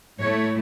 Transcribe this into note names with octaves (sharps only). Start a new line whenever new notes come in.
A2 A3 E4 C#5